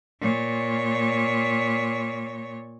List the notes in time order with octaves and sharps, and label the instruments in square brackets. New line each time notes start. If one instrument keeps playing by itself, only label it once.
[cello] A#2 C#5